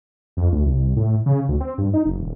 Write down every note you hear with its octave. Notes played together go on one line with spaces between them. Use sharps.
F2
D2
C2
A2
C#3
D2
C4
G2
D#4
F#1
D#1